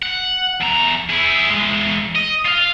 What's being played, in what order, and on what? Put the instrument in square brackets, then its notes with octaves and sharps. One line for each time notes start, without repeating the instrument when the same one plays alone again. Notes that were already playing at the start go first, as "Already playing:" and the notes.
[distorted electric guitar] F#5
E2 A#5
E4 G#4
E3 G#3
D#5
F4 F5